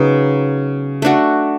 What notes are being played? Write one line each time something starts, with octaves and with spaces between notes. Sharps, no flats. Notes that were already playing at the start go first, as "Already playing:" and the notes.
Already playing: C#3 F#3 B3 D#4
A3 D4 F#4